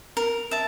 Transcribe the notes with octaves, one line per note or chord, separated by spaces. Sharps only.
A#4
E5 A5